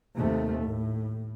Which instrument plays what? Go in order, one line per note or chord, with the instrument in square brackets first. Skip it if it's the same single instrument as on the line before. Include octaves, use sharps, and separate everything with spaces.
[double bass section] D#2 C3 A3
A2